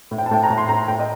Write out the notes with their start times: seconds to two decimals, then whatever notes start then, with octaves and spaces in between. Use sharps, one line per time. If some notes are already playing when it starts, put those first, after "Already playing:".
0.11 A2
0.18 G5
0.26 A5
0.31 A2 G5
0.43 A#5
0.50 A2
0.58 C6
0.69 A2 A#5
0.88 A2 G5
1.00 D#5